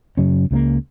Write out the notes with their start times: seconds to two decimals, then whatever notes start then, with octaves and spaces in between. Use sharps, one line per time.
0.17 F#2 C#3 F#3 C#4
0.51 C#2 C#3 E3 A#3